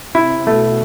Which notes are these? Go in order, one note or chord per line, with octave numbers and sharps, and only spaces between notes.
C3 E4
B2 A3